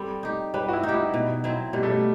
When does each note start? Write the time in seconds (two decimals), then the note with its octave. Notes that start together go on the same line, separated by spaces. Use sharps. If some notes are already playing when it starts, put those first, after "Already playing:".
Already playing: G3 C4 A4
0.23 D#4 G4
0.54 G3 B4
0.68 F#4
0.73 E4
0.83 D#4
0.88 G4
0.94 E4
1.14 B2
1.44 F#3 C4 E4
1.73 B2 G3
1.83 A3
1.91 G3